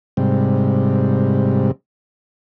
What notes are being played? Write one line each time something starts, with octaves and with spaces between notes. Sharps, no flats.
G#2 C3 G3